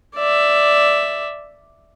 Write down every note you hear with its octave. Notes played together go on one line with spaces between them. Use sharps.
D5 E5